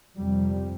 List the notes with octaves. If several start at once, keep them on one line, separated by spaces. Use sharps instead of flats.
F2 C3 G3